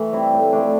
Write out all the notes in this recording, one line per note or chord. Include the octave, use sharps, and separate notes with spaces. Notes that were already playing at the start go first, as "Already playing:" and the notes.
Already playing: E3 A3
G3 C4 E4
A2
F3 A3 D4